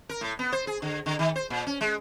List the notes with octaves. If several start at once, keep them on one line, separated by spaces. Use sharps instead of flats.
A#4
A2
B3
C5
G#4
D3
D3
D#3
C5
A#2
C#4
G#3